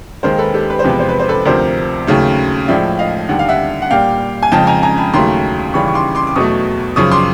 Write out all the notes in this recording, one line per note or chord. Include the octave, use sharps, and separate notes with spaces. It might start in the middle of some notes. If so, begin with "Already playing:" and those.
D#2 D#3 G#3 A#4 C5
A4 B4
G4 A4
B4
C5
E2 C3 F3 G#3 B4
C5
B4
C5
A4 B4
D2 C3 F3 A#4 C5
D#2 C#3 F#3 A3
A2 F3 G#3 D5 E5
D#5 F5
D#2 D3 G3 F#5
F5
E5 F#5
F#5
A#2 G3 F5 G5
G#5
F2 C#3 F3 G#3 G5 A5
G#5 A#5
G#5 A#5
A5 B5
D#2 C#3 F#3 A3 A#5 C6
D#2 C#3 E3 G3 B5 C#6
C#6
C6 D6
C6 D6
D6
E2 B2 F#3 A3 C#6 D#6
F#2 C#3 F3 C#6 D#6
C6 D6